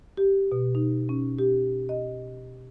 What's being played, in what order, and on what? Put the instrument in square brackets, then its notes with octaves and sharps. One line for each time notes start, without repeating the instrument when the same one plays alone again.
[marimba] G4
B2
D#4
C#4
G4
D#5